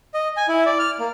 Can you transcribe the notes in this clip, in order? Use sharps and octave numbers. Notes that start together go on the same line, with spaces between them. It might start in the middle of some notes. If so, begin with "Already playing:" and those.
D#5
G#5
E4
D5
F6
A#3